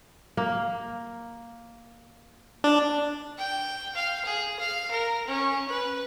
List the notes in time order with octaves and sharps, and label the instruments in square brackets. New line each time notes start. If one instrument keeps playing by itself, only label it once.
[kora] A#3
[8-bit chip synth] D4
[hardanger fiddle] G5
F5
G#4
F5
A#4
C#4
B4